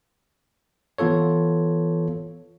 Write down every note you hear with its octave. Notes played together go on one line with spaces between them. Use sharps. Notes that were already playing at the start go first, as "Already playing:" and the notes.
E3 B3 F4 A4 C#5